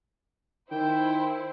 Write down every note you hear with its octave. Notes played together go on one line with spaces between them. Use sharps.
D#3 E4 C5 G5